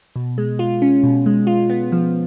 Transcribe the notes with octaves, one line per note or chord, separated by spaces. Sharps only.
B2
G#3
F4
C#4
B2
G#3
F4
B3
F3